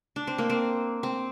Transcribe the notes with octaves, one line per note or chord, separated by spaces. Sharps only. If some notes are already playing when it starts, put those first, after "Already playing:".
D4
C4
A#3
C4
C4